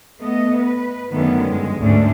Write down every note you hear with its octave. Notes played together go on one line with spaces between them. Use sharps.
A3 B3 D#5
B4
F#2 D3 D#3 A3 B3 C#4
G2 G#3
D2 G#2 A3 C#4 D4